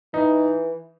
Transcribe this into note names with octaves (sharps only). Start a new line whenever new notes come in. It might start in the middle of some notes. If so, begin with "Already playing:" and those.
E3 D#4